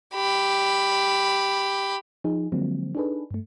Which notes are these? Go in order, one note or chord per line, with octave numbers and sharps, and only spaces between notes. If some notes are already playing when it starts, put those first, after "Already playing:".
G4 B5
F3 D#4 G#4
D3 F3 F#3 G#3 A#3 C4
D4 D#4 G#4 A4 B4
G2 A3